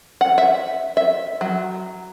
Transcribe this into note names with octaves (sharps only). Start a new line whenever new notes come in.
F#5
E5
E5
F#3